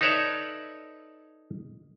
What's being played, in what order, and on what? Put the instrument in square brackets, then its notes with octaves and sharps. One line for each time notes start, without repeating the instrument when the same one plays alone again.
[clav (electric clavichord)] D#4 A4 B4 C#5 D5 E5